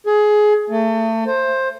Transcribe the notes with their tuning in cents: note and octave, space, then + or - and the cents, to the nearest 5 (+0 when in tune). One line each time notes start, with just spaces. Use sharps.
G#4 +20
A3 +30
C5 +15